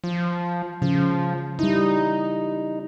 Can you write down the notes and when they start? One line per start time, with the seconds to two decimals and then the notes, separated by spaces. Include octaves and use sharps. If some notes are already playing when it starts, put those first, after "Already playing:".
0.04 F3
0.82 C#3 F3
1.59 G3 D#4 E4